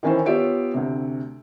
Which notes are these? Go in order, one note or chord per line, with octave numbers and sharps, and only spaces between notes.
D#3 E3 C#4 E4 C5
B3 F4 G4 C#5 E5 D7
D2 C3